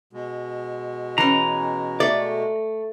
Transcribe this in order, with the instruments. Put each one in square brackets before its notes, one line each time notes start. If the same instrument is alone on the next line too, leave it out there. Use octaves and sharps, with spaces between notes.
[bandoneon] B2 G#3
[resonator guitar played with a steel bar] E3 C#4 [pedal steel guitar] A#5
[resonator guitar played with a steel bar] A3 [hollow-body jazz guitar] D5